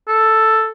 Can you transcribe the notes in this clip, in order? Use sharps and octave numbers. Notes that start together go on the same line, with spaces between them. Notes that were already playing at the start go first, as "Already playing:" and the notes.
A4